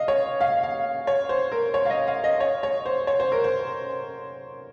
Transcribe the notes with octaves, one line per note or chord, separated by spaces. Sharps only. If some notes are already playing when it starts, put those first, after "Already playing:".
Already playing: D#5 F5
C#5
F5
F5
C#5
C5
A#4
C#5
F5
D#5
F5
D#5
C#5
C#5
C5
C#5
C5
A#4
C5